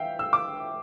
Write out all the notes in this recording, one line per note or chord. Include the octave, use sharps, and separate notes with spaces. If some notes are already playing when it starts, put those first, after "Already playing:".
Already playing: E3 E5 F5 G5
E6
D6